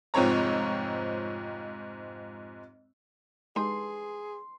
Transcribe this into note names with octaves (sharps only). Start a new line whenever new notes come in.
F1 G#2 F3 C4 C#5 A#5
G#3 D#4 G4 G#4 C6